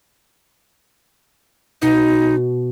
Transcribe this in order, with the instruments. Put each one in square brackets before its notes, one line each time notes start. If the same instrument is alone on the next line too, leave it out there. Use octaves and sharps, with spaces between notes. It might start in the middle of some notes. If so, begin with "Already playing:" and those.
[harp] B2 [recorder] D#4